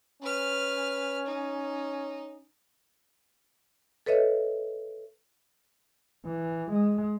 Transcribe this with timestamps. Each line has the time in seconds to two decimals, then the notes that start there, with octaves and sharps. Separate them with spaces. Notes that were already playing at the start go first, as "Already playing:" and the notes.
0.22 C#4 B4 F6
1.26 D#4
4.06 A4 B4 C#5 D#5 E5
6.25 E3
6.71 G#3